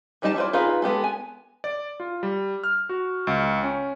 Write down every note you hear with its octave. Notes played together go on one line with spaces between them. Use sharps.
E3 G3 D#4 G#4 A5
E4 F4 B4 C5 D5
D#4 F4 G#4 B4 F5
G#3 B3 G4 A4
G#5
D5
F4
G3
F6
F#4
C#2
C#4